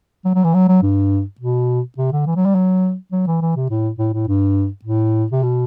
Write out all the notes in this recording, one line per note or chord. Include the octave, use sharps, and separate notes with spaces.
F#3
F#3
E3
F#3
F#3
G2
B2
C3
D3
E3
F#3
G3
F#3
F#3
E3
E3
C3
A2
A2
A2
G2
A2
C3
B2